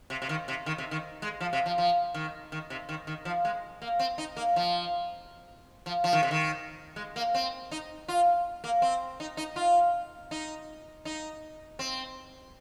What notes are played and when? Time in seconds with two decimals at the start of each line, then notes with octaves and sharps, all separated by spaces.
0.10 C3
0.22 C3
0.29 D#3
0.48 C3
0.66 D#3
0.78 C3
0.91 D#3
1.22 G#3
1.41 F3
1.53 C3
1.66 F3
1.78 F3
2.14 D#3
2.52 D#3
2.70 C3
2.89 D#3
3.07 D#3
3.25 F3
3.45 G#3
3.82 A#3
3.99 C4
4.18 D#4
4.37 A#3
4.56 F3
5.86 F3
6.04 F3
6.13 D#3
6.23 C3
6.31 D#3
6.96 G#3
7.16 A#3
7.34 C4
7.71 D#4
8.08 F4
8.64 A#3
8.82 C4
9.20 D#4
9.37 D#4
9.56 F4
10.31 D#4
11.05 D#4
11.79 C4